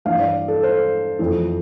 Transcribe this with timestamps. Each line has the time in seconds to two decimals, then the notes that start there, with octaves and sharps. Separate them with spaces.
0.05 G2 E3 F5
0.19 D5
0.48 A4
0.63 C5
1.19 F2 E3